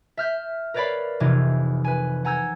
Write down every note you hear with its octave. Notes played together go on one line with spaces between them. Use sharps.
E5 F6 G6 B6
A#4 B4 C#5 D5 F5 B5
F1 C3 E3 D#4 F4 G#6
B4 G#5
F#5 G#5 A#5 E6 G6 G#6